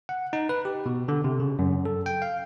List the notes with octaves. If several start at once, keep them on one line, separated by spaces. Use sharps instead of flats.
F#5
D#4
B4
G4
B2
D3
C3
C#3
F#2
A4
G5
F5